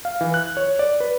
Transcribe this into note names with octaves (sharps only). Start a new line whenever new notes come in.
F5
E3
F#6
C#5
D5
B4